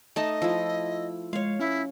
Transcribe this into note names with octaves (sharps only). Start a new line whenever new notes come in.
A3 D#4 D#5 A5
F3 E4 E6
G#3 C#5 F5
C#4 E4